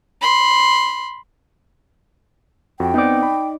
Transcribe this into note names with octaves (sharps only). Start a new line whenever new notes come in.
B5 C6
F2 F#4 G5
B3 C4 D#4 D5 F#5
B5